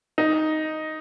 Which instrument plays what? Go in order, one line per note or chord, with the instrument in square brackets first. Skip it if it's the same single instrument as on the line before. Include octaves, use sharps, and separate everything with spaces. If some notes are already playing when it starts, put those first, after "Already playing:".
[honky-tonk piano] D#4